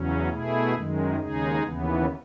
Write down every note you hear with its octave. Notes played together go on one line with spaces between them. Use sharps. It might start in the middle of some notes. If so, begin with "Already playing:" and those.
Already playing: E2 C#3 F#3 C#4
B2 A3 E4 G#4
F#2 D#3 G#3
D#2 C#3 G#3 D#4 G#4
D#2 C#3 E3 B3